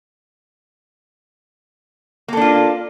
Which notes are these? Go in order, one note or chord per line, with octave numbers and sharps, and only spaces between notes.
A#3 D4 F4 A4